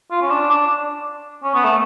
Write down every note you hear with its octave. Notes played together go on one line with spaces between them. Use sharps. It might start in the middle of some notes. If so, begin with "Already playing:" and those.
F4
C#4
D4
D4
C#4
B3
A3